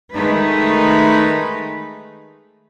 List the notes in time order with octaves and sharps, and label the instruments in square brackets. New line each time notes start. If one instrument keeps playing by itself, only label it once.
[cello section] D#3 G#3 A3 D#4 B4